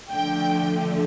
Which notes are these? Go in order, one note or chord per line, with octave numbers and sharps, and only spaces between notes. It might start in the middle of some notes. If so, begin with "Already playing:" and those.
D3 F3 A3 G5